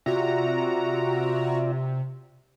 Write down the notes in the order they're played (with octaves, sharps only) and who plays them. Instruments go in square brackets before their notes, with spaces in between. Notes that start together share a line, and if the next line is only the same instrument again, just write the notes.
[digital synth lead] C3 [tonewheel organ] F4 D5 E5 [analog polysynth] F#4 A#5